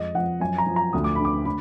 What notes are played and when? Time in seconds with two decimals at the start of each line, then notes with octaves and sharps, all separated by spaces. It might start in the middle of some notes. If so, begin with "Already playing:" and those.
Already playing: F2 G#3 D#5
0.15 F3 F#5
0.40 F#2 G#5
0.58 A#5
0.66 F3
0.76 A#5
0.93 D2 D#6
1.04 D6
1.15 D3 B5
1.25 D6
1.45 D3 B5